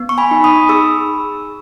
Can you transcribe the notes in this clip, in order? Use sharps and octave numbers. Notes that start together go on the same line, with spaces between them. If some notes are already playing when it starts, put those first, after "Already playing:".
Already playing: B3
C#6
G#5 B5
D#4
B5 D#6
G#4 C#6 E6